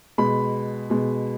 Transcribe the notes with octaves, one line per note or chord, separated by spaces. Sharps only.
B2 G#3 B5
B2 G#3